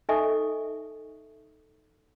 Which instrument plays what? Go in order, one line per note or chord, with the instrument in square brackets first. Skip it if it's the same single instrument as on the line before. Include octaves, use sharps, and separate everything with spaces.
[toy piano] D#4 A4 D#5 E5 G#5 C#6